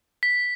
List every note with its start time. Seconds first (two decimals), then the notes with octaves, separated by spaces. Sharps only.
0.23 B6